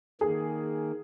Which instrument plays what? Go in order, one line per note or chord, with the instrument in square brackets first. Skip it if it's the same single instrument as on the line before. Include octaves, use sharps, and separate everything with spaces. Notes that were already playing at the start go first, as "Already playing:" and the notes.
[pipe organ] D#3 A#3 [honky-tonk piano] G#4